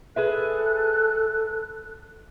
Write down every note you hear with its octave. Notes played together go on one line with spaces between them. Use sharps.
G#4 A4 B4 E5 F#6